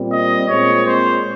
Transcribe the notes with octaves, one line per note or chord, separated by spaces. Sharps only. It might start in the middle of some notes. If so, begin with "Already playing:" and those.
Already playing: A#2 G3 C4
D#5
A#2 G#3 C4 C#5
C5